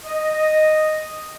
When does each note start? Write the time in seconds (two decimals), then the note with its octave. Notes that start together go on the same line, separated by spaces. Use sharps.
0.06 D#5